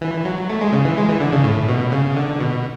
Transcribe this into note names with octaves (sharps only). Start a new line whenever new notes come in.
E3
F#3
A3
G#3
C#3
E3
G#3
E3
D3
C#3
A2
B2
C#3
D3
B2